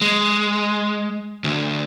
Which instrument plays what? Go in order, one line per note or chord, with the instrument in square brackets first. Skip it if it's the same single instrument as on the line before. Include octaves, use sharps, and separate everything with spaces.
[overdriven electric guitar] G#3
D2